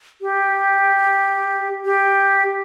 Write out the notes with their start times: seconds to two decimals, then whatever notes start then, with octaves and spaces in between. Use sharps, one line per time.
0.22 G4
1.85 G4